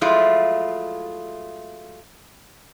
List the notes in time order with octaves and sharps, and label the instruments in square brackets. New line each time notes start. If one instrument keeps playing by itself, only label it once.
[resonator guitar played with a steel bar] F3 F#3 G#3 A3 E4 F4